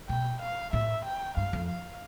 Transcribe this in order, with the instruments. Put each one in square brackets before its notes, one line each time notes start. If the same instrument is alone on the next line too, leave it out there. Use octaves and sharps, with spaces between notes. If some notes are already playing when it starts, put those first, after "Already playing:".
[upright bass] B2 [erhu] G5
[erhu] F5
[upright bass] A2 [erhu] E5
[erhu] G5
[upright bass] G2 [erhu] F5
[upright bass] F2
[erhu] F5